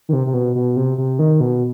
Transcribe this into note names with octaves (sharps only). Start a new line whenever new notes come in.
D#3
C3
C3
B2
B2
C3
C3
D#3
B2